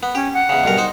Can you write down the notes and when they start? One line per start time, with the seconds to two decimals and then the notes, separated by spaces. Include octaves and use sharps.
0.03 B3
0.15 C#4 G4
0.34 F#5
0.49 E2 C#3
0.64 B1 G2 A#4
0.78 D#4 C5